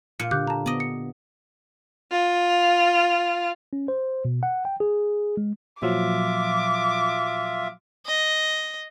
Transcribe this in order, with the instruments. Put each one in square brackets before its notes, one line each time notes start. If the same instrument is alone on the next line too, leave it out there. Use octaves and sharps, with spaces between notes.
[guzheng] A#2 [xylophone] C#7
[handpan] D3 G4 [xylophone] D6 F#6 G6
[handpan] D4 [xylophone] A5 A#5
[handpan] B3 [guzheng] D5 D#5
[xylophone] C#7
[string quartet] F4
[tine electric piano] C#4
C5
B2
F#5
G5
G#4
G#3
[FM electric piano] A#2 F3 F#3 [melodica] F4 E5 [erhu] D6
[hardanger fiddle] D#5